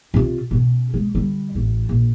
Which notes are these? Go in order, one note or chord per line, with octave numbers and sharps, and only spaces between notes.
C3 F4
B2 C#4
G#3
D3 G3
A1 D4
A#1